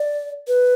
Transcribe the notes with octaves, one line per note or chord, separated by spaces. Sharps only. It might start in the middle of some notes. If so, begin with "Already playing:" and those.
Already playing: D5
B4